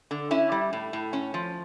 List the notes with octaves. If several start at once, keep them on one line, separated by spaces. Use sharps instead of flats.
D3
C#4 E4
G3
A2
A2
C#4
F3